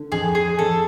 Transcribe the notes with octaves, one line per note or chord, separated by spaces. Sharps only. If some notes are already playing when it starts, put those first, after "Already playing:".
Already playing: D3
F2 G#4
G#4
F2 A4